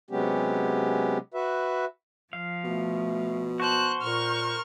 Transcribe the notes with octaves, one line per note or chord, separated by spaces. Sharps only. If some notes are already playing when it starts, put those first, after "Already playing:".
C3 F#3 G#3 B3 C#4 G4
F#4 B4 E5
F3 F5
B2 A3
F#4 C5 A5 F#6
A#2 A#4 C#6 F6